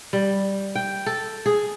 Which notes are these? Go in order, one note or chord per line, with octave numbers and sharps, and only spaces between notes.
G3
G5
A4
G#4